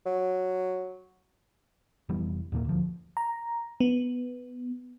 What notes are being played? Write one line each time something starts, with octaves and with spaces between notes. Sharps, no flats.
F#3
F1 E3 G3 B3
D#2 A#2 A3 A#3
D2 F3
A#5
B3